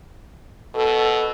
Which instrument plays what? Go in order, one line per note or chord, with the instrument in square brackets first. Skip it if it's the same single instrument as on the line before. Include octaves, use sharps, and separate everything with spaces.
[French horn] B2 [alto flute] A4